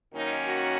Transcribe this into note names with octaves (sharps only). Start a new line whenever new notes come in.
F#2 D#3 A#3 C#4 D#4
F#4